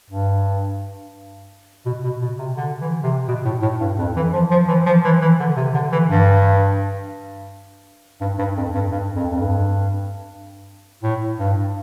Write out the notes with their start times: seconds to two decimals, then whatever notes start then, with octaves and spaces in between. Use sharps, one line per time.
0.10 G2
1.86 B2
2.04 B2
2.22 B2
2.39 C3
2.57 D3
2.81 E3
3.03 C3
3.28 B2
3.45 A2
3.62 A2
3.81 G2
3.99 F2
4.16 E3
4.33 F3
4.51 F3
4.68 E3
4.86 F3
5.04 E3
5.21 E3
5.40 D3
5.56 C3
5.74 D3
5.92 E3
6.09 G2
8.21 G2
8.39 G2
8.57 F2
8.75 G2
8.91 G2
9.16 F2
9.32 F2
9.38 G2
11.03 A2
11.39 G2